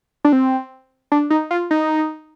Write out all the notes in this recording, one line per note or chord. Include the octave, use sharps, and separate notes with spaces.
D4
C4
D4
D#4
F4
D#4